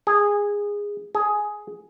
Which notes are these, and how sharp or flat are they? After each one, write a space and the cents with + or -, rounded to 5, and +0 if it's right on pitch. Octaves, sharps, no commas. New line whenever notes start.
G#4 -15
G#4 +10